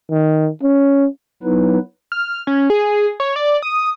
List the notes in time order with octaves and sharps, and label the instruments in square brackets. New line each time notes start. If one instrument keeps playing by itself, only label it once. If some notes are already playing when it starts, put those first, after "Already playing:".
[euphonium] D#3
C#4
[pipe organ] F#3 B3 D#4 E4 B4
[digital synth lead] F6
C#4
G#4
C#5
D5
D#6